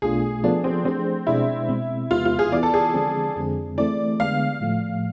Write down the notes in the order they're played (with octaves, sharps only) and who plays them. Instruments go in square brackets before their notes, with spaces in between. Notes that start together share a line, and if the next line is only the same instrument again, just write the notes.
[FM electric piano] B1 B2 A3 D4 F4 [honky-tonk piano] G#4
[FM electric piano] F3 B3 F4 A4 [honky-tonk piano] D4
[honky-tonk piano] C4
[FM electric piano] F3 A3 D4 G#4 [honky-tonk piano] C4
[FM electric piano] B2 G#3 D4 G#4 D5 [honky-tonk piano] E4
[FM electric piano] B2 G#3 C4
[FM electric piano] E2 C3 G#3 B3 [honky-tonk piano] F4
[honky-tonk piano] F4
G#4
[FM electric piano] E3 B3 E4 [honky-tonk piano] D5
[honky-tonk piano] A4
G#4
[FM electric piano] D3 F3 G#3 C4
F2 D3 G#3 C4 G#4
[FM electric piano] E3 A3 C4 E4 [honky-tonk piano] D5
[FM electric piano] D3 G#3 B3 [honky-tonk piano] F5
[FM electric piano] A2 F3 A3